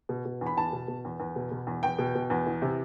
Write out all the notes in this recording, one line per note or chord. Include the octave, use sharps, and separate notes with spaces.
B2
B2
E2
B5
E2 A5
B2
B2
E2
E2
B2
B2
E2
E2 G5
B2
B2
E2
E3
C3